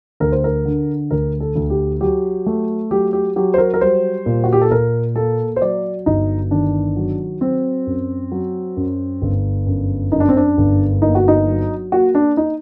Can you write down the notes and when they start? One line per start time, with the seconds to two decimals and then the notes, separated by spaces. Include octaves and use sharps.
0.20 D2 A#4
0.32 C5
0.44 A#4
0.65 D3
1.11 D2 A#4
1.40 A4
1.56 D2
1.70 G4
2.01 F#3 G4
2.46 A3
2.91 F#3 G4
3.13 G4
3.36 F#3 G4
3.54 C5
3.58 A#4
3.74 A#4
3.81 G3 C5
4.26 A#2
4.44 F#4
4.53 G4
4.61 A4
4.71 A#2 A#4
5.16 A#3 A4
5.56 C5
5.61 F#3 D5
6.06 G1 D#4
6.51 D#3 D4
6.96 F#3
7.41 F#3 C4
7.87 F#2
8.31 F#3
8.77 F#2
9.21 G1
9.66 F#2
10.12 F#2 D#4
10.20 D4
10.29 C4
10.37 D4
10.57 G1
11.02 A#3 D#4
11.15 F#4
11.28 D#4
11.47 F#3
11.92 A#3 F#4
12.15 D4
12.37 D#4